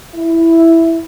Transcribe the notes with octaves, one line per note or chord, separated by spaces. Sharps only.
E4